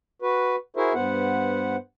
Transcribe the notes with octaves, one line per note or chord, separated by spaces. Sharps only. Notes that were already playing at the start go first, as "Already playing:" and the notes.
F#4 B4
E4 F#4 G#4 A#4 C5 E5
G2 B3 C5 F#5